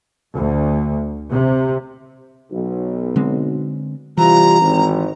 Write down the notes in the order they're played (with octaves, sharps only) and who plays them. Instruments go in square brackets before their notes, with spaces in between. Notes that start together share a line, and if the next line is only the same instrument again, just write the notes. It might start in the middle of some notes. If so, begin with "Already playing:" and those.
[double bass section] D2
C3
[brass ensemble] B1
[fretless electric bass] D3 G#3 C4
[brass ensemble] C3 G3 F4 [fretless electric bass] E3 [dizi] A#5
[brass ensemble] G#1